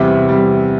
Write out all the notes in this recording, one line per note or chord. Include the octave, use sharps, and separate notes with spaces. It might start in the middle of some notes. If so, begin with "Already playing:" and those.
Already playing: E2 C3 G3 E5
C3 G3